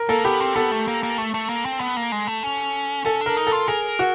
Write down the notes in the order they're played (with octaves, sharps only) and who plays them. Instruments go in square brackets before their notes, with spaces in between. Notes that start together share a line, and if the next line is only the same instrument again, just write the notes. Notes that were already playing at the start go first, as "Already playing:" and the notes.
Already playing: [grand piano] A#4
[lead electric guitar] A#3 [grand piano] A4
[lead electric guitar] B3 [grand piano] G4
[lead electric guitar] C4
[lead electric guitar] B3 [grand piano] A4
[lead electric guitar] A3
A#3
A#3
A3
A3
A#3
C4
B3
A#3
G#3
A3
C#4
[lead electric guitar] C#4 [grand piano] A4
[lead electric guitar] D4 [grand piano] A#4
[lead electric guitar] D#4
[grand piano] A4
[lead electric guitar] F4
[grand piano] G#4 [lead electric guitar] A#4
[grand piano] F#4